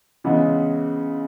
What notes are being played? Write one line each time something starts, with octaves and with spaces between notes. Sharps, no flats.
C#3 E3 G#3 B3